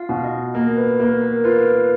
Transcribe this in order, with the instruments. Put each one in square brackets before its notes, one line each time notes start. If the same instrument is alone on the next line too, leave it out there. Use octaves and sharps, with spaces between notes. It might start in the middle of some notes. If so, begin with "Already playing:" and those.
Already playing: [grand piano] F4 [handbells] F5
[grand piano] B2
[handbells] D#5
[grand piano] A#3 [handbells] D#5
[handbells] B4
B4
[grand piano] A#3 [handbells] A#4
[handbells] A#4
[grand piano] F4 [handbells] B4
[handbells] B4
B4